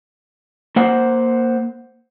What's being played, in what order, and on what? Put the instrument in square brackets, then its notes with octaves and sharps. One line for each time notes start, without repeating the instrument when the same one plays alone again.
[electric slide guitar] A#3 C5 F#5